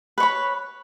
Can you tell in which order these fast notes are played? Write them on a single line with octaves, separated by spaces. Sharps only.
B4 C#5 B5